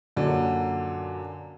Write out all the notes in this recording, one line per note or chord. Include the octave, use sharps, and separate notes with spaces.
F#2 A#2 D3 F#3